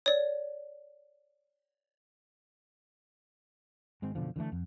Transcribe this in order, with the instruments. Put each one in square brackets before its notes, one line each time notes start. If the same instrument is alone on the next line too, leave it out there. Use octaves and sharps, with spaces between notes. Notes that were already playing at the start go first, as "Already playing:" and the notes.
[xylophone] C#5 D5
[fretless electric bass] G#1 G#3 C4
F#1 B2 D3 F3
D3 E3 G#3 A3
F2